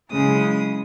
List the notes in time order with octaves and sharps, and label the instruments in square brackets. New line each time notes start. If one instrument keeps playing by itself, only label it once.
[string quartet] C#3 F#3 G#3 E4 D#6